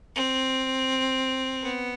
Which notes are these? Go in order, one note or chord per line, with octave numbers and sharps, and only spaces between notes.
C4
B3